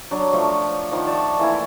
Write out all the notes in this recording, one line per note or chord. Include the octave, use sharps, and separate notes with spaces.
F#3 D4
F3 A3
D#3 F3 F#5
D5 A5 C#6
E3 A3 A#3 E4